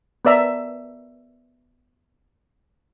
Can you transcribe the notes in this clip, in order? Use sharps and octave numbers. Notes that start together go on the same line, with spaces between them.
B3 A#4 D5 E5 A#5